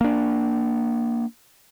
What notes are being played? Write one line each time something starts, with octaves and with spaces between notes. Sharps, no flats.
A#3 D4